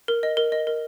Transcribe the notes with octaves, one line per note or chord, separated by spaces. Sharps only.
A#4
D#5
A#4
D#5
A#4